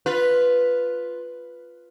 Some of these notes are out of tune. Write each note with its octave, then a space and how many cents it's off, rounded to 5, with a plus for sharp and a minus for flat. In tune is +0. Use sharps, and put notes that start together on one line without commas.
F4 +0 B4 +0